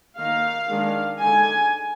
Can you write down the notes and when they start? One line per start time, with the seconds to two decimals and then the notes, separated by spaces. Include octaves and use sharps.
0.18 D#3 A#3 D#4 F5
0.70 D#3 G#3 D4
1.20 D3 G#3 D#4 G#5